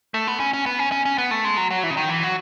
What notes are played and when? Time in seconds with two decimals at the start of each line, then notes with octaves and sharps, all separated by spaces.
0.14 A3
0.27 B3
0.40 C#4
0.53 C#4
0.66 B3
0.79 C#4
0.92 C#4
1.05 C#4
1.18 B3
1.31 A3
1.45 G#3
1.57 F#3
1.70 F#3
1.84 E3
1.90 C#3
1.97 D#3
2.09 E3
2.23 F#3